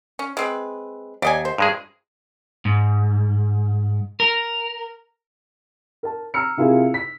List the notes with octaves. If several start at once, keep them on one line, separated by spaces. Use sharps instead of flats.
C#4
G#3 C4 B4
D#2 D5 D#5 G#5
C5
G2 G#3 G#4
G#2
A#4
A#4 A5
A#5 E6 F6 C#7
C3 E4 F4 G#4 A#4
B6